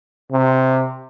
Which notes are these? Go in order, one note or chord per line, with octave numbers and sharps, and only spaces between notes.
C3